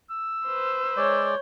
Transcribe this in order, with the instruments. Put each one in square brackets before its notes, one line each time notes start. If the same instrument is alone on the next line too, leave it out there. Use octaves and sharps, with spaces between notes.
[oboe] E6
[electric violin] B4 C5
[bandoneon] G#3 D5 [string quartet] C#5 G6